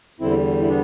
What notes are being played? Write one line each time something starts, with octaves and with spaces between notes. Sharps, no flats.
E2 D3 G3 C4 E4
E4
B3 D4